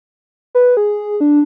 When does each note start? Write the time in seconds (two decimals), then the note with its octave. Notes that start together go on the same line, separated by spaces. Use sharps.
0.55 B4
0.77 G#4
1.21 D4